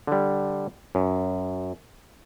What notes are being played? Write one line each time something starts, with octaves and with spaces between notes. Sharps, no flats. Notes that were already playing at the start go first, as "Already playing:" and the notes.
D3 G3
F#2